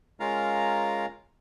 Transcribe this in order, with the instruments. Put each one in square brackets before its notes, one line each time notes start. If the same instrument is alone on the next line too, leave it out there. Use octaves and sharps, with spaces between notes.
[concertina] G#3 C#4 F4 A#4 F5 A#5